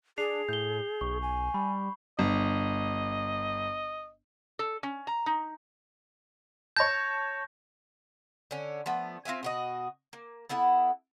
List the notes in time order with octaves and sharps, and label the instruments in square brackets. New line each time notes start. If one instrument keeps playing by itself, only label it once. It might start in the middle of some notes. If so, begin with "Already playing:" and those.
[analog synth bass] D4 [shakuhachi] G#4 [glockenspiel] C7 F7
[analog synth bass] A2 [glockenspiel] G6 G7
[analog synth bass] B1 [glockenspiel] C#6
[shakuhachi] G#5
[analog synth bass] G3 [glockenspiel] B5
[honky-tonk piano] G1 [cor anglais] D#5
[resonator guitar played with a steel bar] A4
C#4
A#5
D#4
[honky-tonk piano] C#5 A5 [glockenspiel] G6 A#6
[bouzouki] D3 C#4
F3 A3 B3
C4 F4 E5 G#5
B2 F#4 D#5
A#3
B3 E4 A4 F#5